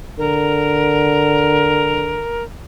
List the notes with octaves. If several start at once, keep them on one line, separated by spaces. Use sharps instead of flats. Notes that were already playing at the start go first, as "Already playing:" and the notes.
D3 A#4